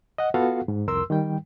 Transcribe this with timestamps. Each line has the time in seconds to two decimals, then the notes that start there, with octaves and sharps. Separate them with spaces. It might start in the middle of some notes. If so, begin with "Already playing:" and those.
0.18 D#5 F#5
0.34 B3 F4 F#4 A4 F5 F#5
0.68 G#2
0.88 C2 F2 A#4 C6 E6
1.10 D#3 G3 G5